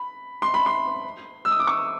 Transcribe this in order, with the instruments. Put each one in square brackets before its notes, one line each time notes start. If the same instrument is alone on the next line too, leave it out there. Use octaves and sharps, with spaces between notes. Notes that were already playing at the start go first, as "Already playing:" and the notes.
Already playing: [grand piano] B5
C6
B5
C6
E6
D#6
D6
C#6